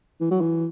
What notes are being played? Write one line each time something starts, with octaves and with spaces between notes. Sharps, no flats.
E3
F#3
E3